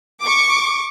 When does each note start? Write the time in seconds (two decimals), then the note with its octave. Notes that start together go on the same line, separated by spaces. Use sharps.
0.22 C#6 D6